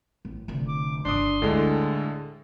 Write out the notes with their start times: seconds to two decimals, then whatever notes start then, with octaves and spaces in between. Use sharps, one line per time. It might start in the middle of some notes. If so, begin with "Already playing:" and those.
0.25 A1
0.48 F1 D3
0.68 D6
1.05 G1 D#3 D4 C6 D6 D#6
1.42 D2 A2 D3 G#3 A4